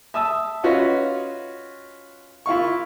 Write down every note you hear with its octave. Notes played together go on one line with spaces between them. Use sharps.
E5 A5 D#6 E6
C#4 F4 F#4 B4 D#5
E4 F4 F5 C#6